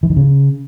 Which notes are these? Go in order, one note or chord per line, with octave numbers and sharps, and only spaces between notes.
E3
D#3
C#3